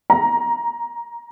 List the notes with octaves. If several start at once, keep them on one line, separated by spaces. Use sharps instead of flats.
A#5